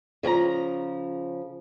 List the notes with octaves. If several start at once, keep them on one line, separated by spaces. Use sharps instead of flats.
C#3 F3 G#5 A#5